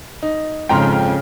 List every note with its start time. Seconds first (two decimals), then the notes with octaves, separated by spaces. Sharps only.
0.22 D#4
0.69 F2 G#2 C#3 G5 A#5 C6 F6